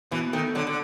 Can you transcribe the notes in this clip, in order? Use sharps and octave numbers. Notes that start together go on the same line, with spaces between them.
B2 E3
D#3 A3
D3 F#3
D3